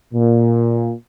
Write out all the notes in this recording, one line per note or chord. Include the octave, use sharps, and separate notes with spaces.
A#2